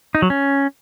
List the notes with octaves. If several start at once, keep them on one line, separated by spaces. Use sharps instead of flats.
D#4
F#3
C#4